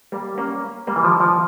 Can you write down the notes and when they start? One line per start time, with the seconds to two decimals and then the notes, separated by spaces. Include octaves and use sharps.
0.12 G3 A#3
0.37 A#3 C#4
0.87 G3 A#3
0.96 E3
1.04 F3
1.20 F3